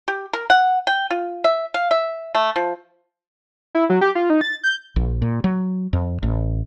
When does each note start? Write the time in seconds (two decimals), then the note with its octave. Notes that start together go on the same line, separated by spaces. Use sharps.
0.08 G4
0.33 A#4
0.50 F#5
0.87 G5
1.10 F4
1.44 E5
1.74 F5
1.91 E5
2.35 A3
2.56 F3
3.75 E4
3.90 F#3
4.01 G4
4.15 F4
4.30 D#4
4.41 A6
4.63 G6
4.96 A#1
5.22 A#2
5.44 F#3
5.93 F2
6.23 A1